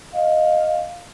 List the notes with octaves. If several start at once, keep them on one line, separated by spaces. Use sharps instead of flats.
D#5 F5